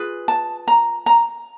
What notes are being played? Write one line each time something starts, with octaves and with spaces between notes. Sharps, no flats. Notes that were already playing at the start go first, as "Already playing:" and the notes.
Already playing: F4 G#4 B4
A5
A#5
A#5